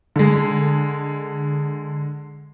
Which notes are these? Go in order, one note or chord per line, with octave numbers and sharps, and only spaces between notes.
D3 G#3